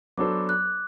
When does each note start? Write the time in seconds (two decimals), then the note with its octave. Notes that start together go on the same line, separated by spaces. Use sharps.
0.18 F#3 B3 D4 A4 C5 D6
0.49 F#6